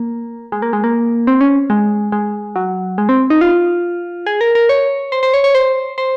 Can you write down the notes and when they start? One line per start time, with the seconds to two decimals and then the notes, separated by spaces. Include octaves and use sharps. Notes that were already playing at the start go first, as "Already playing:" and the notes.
Already playing: A#3
0.52 G#3
0.62 A#3
0.73 G#3
0.84 A#3
1.27 C4
1.41 C#4
1.70 G#3
2.12 G#3
2.56 F#3
2.98 G#3
3.09 C4
3.30 D#4
3.41 F4
4.27 G#4
4.41 A#4
4.55 A#4
4.69 C#5
5.12 C5
5.23 C5
5.34 C#5
5.44 C#5
5.55 C5
5.98 C5